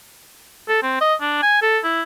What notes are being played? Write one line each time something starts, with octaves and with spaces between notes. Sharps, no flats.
A4
C4
D#5
D4
G#5
A4
E4